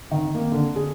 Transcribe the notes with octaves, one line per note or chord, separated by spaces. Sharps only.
D#3
A#3
D3
G#4